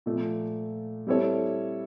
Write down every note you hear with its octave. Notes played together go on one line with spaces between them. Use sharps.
A#2 F3 A3
G3 C4 E4 A4 C#5